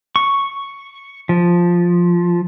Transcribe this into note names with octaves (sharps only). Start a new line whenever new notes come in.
C#6
F3